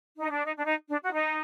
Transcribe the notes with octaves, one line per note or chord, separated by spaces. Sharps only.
D#4
D4
D#4
D4
D#4
D4
F#4
D#4